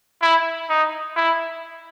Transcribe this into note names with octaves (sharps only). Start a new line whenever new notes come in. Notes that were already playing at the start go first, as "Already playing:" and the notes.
E4
D#4
E4